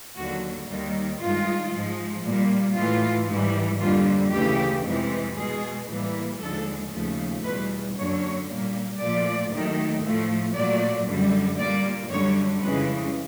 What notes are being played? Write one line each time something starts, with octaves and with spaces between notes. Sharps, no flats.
D#2 D3 F#3 A#3 F#4
D#2 D#3 G3
G2 D#3 G#3 F4
G#2 F3 G#3
A#2 G3 A#3
A2 E3 G#3 F4
G#2 E3 G3
F2 D3 G3 A#3 F4
D2 C#3 E3 A3 G4
F2 C3 E3 G#3
B2 G#3 G#4
A2 E3 G3 A#3
D#2 D3 F3 G#3 A4
D#2 C#3 F3 A3
E2 B2 G3 B4
F#2 D3 F#3 A#3 C#5
A#2 G3 A#3
A#2 F3 A3 D5
D#2 D#3 F#3 A3
A2 F3 A3
A#2 F#3 A3 D5
F#2 D3 G3
A#2 G3 A#3 D5
F#2 D3 G3 C#5
F2 C#3 E3 G#3 B4